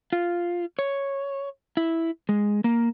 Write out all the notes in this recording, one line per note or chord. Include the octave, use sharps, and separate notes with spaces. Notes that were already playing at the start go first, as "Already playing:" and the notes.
F4
C#5
E4
G#3
A#3